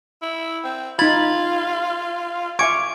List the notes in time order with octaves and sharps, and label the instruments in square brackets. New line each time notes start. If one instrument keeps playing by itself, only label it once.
[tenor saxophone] E4
C4
[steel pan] D#4 B5 [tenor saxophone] F4 [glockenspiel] G#6 A6 F#7
[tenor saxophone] F4 [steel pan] E5 G#5 C#6 [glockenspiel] D6 G#6 D7